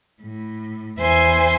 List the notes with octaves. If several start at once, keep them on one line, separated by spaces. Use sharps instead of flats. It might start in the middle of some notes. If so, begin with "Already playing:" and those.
A2
E2 C5 E5 G#5 C6